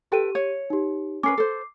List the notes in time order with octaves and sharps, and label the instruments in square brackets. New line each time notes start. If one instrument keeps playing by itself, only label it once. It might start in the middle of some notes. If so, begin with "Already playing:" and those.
[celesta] G4 D#7 [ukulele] A4 B4 G5
[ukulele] C#5
[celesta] D#4 G4
[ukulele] C#4 A#4 B4 [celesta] D6 C7
[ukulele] A4 C5